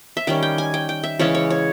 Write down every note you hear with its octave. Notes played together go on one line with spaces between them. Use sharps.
E5
D#3 G3 C#4 G5
G5
G#5
G5
G5
E5
C#3 E3 G#3 C#4 C#5
C#5
C#5